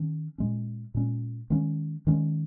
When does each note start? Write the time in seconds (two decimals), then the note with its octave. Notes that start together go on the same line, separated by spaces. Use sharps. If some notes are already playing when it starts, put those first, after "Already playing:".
Already playing: D#3 C#4
0.38 A#2 G#3 C#4
0.94 A#2 G#3 C#4
1.50 D#3 G#3 C#4
2.07 D#3 G#3 C#4